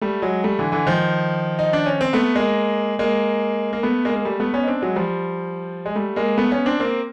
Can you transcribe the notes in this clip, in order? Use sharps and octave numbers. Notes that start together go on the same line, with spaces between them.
G3 A3
F#3 G#3
G3 A3
D3 E3
D3 E3
D#3 F3
D#4
D4
C#4
C4
A3 B3
G#3 A#3
G#3 A#3
A#3
A3 B3
G#3 A#3
A#3
G3 A3
A3 B3
B3 C#4
D#4
C4 D4
F#3 G#3
F3 G3
G#3
G3 A3
G#3 A#3
A3 B3
B3 C#4
C4 D4
A#3 C4